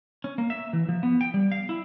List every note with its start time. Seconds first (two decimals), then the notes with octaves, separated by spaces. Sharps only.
0.24 C#4
0.38 A#3
0.50 E5
0.73 E3
0.89 F3
1.03 B3
1.21 G5
1.34 G3
1.52 F5
1.69 E4